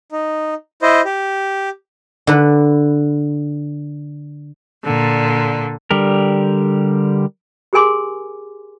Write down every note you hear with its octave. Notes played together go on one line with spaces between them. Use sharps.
D#4
E4 C5 D#5
G4
D3 B4
A#2 D3
D3 G3 G4 A#4
G4 G#4 A#4 G#5 C6 D6